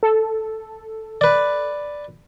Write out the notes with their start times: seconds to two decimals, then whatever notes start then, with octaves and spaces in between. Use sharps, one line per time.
0.03 A4
1.21 B4 D5